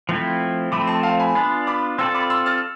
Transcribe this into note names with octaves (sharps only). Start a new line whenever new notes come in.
F3 A3 C4 E4
F3 A3 C4 B5 D6
A5 C6
F5 A5
G#5 B5
B3 D4 F4 G#5 B5
B5 D6
C4 F4 A4 D5 C6 E6
B5 D6
C6 E6
F6 A6